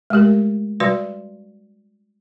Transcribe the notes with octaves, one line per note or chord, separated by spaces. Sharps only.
G#3 A3 G4 A#4
G3 F#4 B4 D5 C6